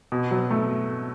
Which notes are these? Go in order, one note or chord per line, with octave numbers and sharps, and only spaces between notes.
B2
F#3
A3